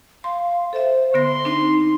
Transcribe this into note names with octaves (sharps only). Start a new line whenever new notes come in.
F5 C6
A4 C5 E5
D3 B3 C6 A#6
C4 D4 D#4